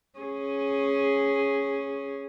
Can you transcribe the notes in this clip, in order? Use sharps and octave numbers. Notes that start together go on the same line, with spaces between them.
C#4 G#4